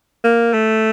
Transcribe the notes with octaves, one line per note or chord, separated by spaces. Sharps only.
A#3
A3